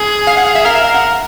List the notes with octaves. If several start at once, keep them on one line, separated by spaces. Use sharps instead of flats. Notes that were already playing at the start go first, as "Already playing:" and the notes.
Already playing: G#4
F5
F#5
F5
E5
A#4 F5
E5
F5
F#5